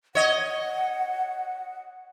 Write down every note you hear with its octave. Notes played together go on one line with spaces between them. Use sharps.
C#5 D#5 F#5